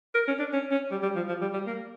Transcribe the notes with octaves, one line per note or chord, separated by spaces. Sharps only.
A#4
C#4
D4
C#4
C#4
G3
G3
F3
F3
G3
G3
A#3